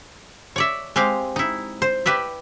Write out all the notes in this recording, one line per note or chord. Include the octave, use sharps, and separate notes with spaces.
C#5 D5 E5
G#3 C4 G4 F5
D#4 E4
C5
G4 B4 D5 E5